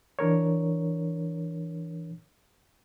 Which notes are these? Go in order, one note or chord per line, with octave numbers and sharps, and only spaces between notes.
E3 D4 A#4 C#5